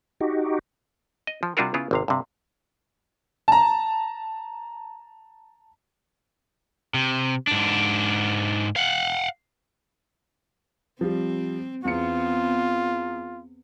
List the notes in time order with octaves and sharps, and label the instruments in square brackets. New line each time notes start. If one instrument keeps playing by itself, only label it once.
[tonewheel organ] D#4 F#4 G4
[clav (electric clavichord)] D#5
F3
C3 G3 D4 F4 F#4 A#4
C#3 B3 E4 F4
G#1 C3 F5
G2 C3
[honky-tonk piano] A5 A#5
[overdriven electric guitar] C3
G#2 D4
F5 F#5
[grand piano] F3 G3 [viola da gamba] C4
[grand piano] E2 C#7 [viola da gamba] B3 C4 [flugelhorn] F4